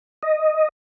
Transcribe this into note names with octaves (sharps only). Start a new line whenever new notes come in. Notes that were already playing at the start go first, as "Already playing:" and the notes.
D#5